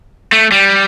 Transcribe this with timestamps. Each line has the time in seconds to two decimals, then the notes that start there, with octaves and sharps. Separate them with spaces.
0.32 A3
0.52 G3